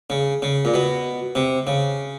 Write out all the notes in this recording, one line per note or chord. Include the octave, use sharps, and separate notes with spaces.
C#3
C#3
A#2
B2
C3
C#3